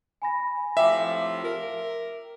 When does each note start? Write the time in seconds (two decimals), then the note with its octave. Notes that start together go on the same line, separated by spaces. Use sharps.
0.22 G#5 B5 A#6
0.77 A2 C3 F3 E5 G5 D6
1.43 A#4